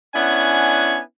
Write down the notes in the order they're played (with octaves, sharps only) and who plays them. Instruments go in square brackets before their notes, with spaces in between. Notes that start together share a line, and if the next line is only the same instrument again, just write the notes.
[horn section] B3 C#4 D4 E4 F#5 G#5